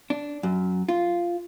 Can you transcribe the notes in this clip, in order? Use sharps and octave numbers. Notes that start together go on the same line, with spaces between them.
D4
F#2
F4